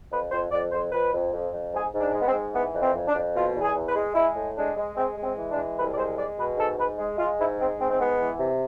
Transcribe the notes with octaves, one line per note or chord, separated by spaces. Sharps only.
F2 B4
F2 C5
F2 D5
F2 C5
F2 B4
F2
F2
F2
G#2 G#4
G#2
D4
G#3
B3
C4
G#2
E3 B3
F2
C4
F2
D4
F2
B2 F4
E2
G#4
E2
B4
G#3
G#3 E4
A2
G#3 D4
G#3
G#3 C4
G#3
C4
E3
D4
G#3
C2 B4
D5
G#3 C5
G#3 D5
B2 B4
G#2 A4
G#2 B4
G#3
G#3 F4
G#2 E4
G#3 C4
G#2 C4
C4
G#3 B3
E3
C3